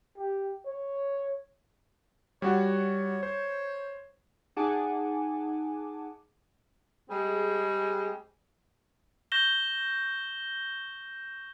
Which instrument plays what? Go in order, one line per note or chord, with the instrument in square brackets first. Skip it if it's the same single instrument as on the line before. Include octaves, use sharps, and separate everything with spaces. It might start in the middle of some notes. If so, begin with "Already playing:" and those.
[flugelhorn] G4
C#5
[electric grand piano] G3 F#4 F#5 [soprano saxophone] C#5
[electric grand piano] C5 [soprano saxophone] C#5
[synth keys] D#4 G#4 F#5 G#5 A5 D6
[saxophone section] G3 G#3 C4 G#4
[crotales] C#6 G6 A#6 E7 G7